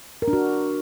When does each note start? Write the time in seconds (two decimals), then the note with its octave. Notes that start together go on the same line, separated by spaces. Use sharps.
0.22 A#4
0.28 D4
0.33 F#4